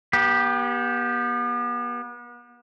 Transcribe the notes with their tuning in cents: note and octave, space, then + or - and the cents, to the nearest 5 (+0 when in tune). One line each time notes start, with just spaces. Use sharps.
B3 -40 G4 +0